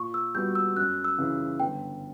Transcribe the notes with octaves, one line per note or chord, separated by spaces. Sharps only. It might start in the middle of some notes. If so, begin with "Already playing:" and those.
Already playing: A#2 C#6
E6
G3 B3 F#4 G6
E6
F#2 F#6
E6
C#3 E3
G1 G5